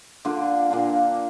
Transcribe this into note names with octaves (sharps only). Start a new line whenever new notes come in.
D3 A#3 D4 F4
A#2 A#3 D4